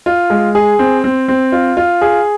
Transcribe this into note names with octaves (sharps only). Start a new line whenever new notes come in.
F4
G#3
G#4
C4
C4
C4
F4
F4
G#4